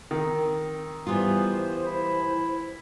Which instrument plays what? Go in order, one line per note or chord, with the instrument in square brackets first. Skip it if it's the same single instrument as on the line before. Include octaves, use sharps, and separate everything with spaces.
[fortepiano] D#3 [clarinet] C4
[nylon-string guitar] E3 G3 F4 [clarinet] B3 [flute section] C5
[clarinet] E4